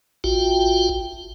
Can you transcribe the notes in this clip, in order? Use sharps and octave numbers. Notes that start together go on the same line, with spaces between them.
A1 F4 F#4 G5